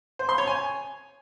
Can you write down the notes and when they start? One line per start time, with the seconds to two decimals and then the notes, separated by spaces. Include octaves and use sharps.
0.19 C5
0.29 C6
0.38 C#5
0.47 G#5